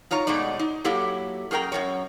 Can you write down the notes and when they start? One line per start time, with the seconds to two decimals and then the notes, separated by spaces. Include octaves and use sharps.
0.11 D#4 F4 C#5 A#5
0.27 B2 G#3 A3 D#4 D5
0.59 D#4
0.84 F#3 A#3 E4 G4 A4
1.51 F#2 G#4 A#4 G5 A#5
1.72 F#2 A#2 A#4 C#5